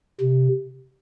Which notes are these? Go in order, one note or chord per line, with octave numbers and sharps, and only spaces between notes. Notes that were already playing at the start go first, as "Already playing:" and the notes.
C3